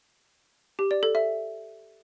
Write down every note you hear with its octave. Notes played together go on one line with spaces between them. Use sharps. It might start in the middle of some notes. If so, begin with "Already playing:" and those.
G4
D5
A4
E5